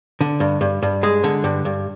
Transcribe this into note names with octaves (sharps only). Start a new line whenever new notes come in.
D3
G2
G2
G2
G#3
D3
G2
G2